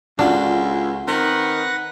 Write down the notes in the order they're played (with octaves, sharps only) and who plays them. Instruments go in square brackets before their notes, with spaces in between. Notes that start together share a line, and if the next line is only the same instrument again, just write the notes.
[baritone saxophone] C#2 [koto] D4 [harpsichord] F4 F#4 A4
[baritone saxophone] D#3 [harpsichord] C4 [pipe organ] B4 F#5 A#6